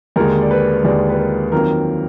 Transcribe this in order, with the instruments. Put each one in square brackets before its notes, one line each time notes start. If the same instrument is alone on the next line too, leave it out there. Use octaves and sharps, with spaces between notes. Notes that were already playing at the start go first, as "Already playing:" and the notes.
[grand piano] D#2 D3 G#3 A#4
D5
B4
D#2 D3 G#3 D5
B4
A#4
F2 D#3 F#3 A#3 A#4